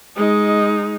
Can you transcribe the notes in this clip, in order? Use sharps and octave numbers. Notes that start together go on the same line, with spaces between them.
G#3 D#4